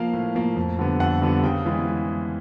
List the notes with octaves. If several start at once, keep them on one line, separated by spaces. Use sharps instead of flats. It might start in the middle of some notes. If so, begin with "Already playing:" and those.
Already playing: F3 A#3 F5
A2
F3 A#3
F2
D3 G3 B3
F2 F#5
D3 G3 B3
C#3 G5
E3 G#3 B3